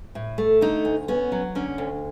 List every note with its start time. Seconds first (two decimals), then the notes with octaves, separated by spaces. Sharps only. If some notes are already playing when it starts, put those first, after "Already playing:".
0.15 A2
0.38 A3
0.61 D3 D#4
0.85 D2
1.08 B3 C#4
1.32 F#3
1.55 D3 C#4
1.78 D2